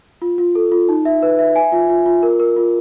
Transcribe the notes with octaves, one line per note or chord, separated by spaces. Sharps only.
F4
F4
A4
F4
D#4
E5
B4
E5
G#5
F4
F4
F4
A#4
A#4
F4